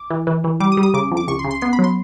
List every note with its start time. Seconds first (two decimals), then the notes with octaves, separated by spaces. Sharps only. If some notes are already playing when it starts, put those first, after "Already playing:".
Already playing: D6
0.10 E3
0.27 E3
0.44 E3
0.60 G3 D6
0.72 D#6
0.77 G3
0.83 D#6
0.94 C#3 D6
1.11 F2
1.17 D6
1.28 C#2 C#6
1.39 C6
1.45 C#3
1.51 C6
1.61 B3 C6
1.73 B5
1.79 F#3
1.84 C6